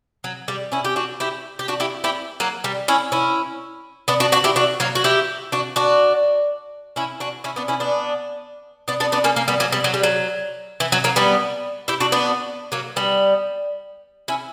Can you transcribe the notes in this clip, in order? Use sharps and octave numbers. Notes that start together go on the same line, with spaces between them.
F#3
G3
C#4 E4
G4
D4 F#4
E4 G4
G4
D4 F#4
E4 G4
E4 G4
F#3 A#3
G3
C#4 E4
C#4 E4
B3 D4
D4 F#4
D4 F#4
E4 G4
D4 F#4
F#3 A#3
F#4
E4 G4
D4 F#4
D4 F#4
C#4 E4
D4 F#4
C#4 E4
B3 D4
C#4 E4
B3 D4
B3 D4
B3 D4
B3 D4
A#3 C#4
A#3 C#4
G3 B3
F#3 A#3
G3 B3
F#3
G3
F#3
E3
F#3
F#3 A#3
G3 B3
E4 G4
D4 F#4
B3 D4
F#3 A#3
G3 B3
C#4 E4